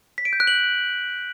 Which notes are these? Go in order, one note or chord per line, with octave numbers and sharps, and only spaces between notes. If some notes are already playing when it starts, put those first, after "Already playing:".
B6
D7
G6
F#6
F#7